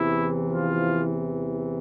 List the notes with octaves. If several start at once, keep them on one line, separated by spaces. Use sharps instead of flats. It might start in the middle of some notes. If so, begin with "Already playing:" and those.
Already playing: E2 C3 E3 E4
F3 F4